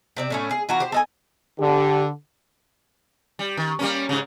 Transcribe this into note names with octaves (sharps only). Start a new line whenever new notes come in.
C3 C4 D5
A2 A3 C#4
G#4
E3 F4 F#4 A#5
G4 C5
A4 D#5 G#5
D3 G4
G3
D#3
G3 A#3 C#4
G#2 C#3